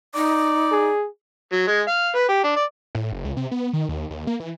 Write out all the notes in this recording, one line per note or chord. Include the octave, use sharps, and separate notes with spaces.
D#4 D5
G#4
F#3
G#3
F5
B4
G4
D4
D5
A2
F#1
C#2
C3
B3
D#3
D#2
D#2
A#3
E3